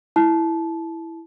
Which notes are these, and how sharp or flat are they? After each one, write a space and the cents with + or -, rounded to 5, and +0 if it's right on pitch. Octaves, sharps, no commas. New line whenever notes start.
E4 +0 A5 -20